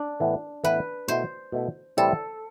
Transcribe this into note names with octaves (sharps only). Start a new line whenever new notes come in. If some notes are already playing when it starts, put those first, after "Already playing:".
Already playing: D4
A2 E3 B3
A2 E3 B3 B4
B2 A3 E4 C5
B2 A3 E4
A2 E3 G3 C4 E4 A4